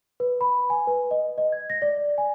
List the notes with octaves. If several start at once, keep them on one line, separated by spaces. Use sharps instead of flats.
B4
B5
G#5
B4
D#5
D#5
G#6
A#6
D5
G#5